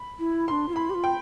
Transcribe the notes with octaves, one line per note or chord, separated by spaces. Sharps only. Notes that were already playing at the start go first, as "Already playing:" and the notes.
Already playing: B5
E4
D4 E4 C6
F4
E4 B5
G4
F4
G5